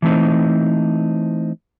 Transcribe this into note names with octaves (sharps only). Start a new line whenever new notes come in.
E3 A3 C4 D#4